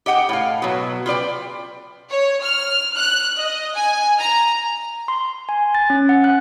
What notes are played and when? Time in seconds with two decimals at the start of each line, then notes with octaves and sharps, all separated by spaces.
0.06 G4 D#5 F#5 G5
0.29 A2 F5
0.62 B2 F#3
1.06 F4 B4 D5 G5
2.10 C#5
2.43 F6
2.96 F#6
3.39 D#5
3.75 G#5
4.20 A#5
5.08 C6
5.49 G#5
5.75 A6
5.90 C#4
6.09 F#5
6.24 F#6